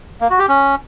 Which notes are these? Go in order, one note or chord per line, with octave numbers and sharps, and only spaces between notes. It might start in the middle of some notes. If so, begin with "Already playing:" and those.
A#3
F#4
G4
C#4